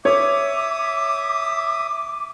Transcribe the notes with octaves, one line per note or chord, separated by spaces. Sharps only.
C#5 E5 D6 D#6